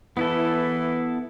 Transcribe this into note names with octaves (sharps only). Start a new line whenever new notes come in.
E3 B3 E4 A4